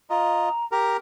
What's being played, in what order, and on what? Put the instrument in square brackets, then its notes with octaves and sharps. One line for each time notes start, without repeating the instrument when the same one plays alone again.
[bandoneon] F4 D#5 [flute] A#5
[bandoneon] G4 A#4 A#5